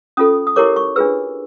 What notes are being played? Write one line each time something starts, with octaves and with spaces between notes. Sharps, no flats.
C#4 F4 A4 D#6
D#6
E4 G4 A#4 C#5 D6
C#6
D4 F4 G#4 B4 E6